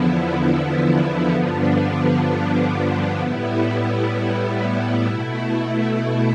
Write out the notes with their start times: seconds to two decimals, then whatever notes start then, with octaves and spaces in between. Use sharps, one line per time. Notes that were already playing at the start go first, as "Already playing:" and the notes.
Already playing: E2 D3 F3 B3 E4
1.33 G2 D3 F3 B3 D4
3.19 A2 G3 B3 E4
5.07 B2 A3 E4